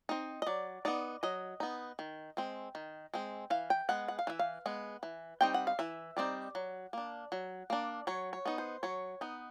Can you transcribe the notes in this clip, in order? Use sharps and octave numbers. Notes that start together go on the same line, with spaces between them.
C4 D#4
D#5
F#3 D5
B3 D#4 D5
F#3 D#5
B3 D#4
D#3
G#3 C4
D#3
G#3 C4
E3 F5
G5
G#3 B3 F#5
F#5
F5
E3 E5
F5
G#3 B3
E3
G3 C4 D#4 G5
F#5
F5
E3 E5
G3 C4 D#4 D5
F#3
A#3 D4
F#3
A#3 D4
F#3 C#5
C#5
B3 D#4
C5
F#3 C#5
B3 D#4